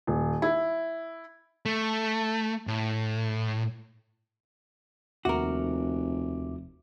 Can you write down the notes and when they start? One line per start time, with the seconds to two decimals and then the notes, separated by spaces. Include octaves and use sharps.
0.07 D#1
0.42 E4
1.66 A3
2.67 A2
5.25 F1 D#2 F#4 A#4 E5 D6